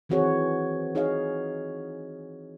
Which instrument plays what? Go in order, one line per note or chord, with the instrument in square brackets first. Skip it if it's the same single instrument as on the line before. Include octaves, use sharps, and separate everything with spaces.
[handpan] D#3 E3 C4 F#4 G#4 C#5
D#4 G#4 C#5 D#5 F5